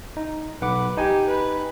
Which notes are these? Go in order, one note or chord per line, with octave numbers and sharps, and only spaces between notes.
D#4
B1 B4 F#5 D6
D#4 G4 G#5
B4